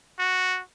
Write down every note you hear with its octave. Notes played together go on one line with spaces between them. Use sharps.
F#4